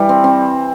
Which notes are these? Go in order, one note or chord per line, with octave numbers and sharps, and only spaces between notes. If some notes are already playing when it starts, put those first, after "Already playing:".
Already playing: E3 G3
C4
C4